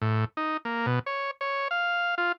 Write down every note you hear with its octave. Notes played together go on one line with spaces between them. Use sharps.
A2
D#4
A#3
B2
C#5
C#5
F5
F4